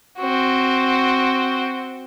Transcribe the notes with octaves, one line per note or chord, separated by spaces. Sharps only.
C4 F#4